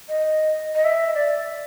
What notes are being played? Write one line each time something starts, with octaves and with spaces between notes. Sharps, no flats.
D#5
D#5
E5
D5